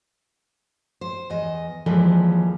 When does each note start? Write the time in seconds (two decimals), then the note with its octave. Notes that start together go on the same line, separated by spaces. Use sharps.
1.01 C5
1.30 E2 D#5
1.86 D#2 E3 F3 G3 G#3